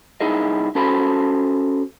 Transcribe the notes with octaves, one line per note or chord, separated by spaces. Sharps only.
C2 D#4 E4 G#4 D#5
C#4 F#4 A4 C5 A5 B5